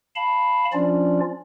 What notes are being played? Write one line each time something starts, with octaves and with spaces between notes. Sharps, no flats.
F5 A5 B5
F3 C#4 D4 F4 D5